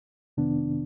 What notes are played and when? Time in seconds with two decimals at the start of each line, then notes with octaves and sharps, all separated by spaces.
0.37 F2 C3 D#3 B3 D4